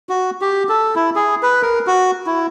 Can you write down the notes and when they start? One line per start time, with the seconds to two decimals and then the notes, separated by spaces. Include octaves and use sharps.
0.09 F#4
0.41 G4
0.69 A4
0.96 E4
1.16 G#4
1.43 B4
1.62 A#4
1.87 F#4
2.26 E4